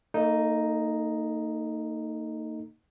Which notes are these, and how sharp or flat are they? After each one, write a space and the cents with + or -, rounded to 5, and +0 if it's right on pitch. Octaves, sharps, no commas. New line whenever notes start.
A#3 -35 D#4 +0 A4 +0